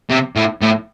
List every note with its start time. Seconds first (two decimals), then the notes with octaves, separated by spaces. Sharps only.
0.10 C3
0.36 A2
0.62 A2